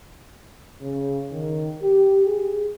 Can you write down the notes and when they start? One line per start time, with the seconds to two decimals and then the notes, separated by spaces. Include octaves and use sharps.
0.81 C#3
1.32 D#3
1.82 G4
2.26 G#4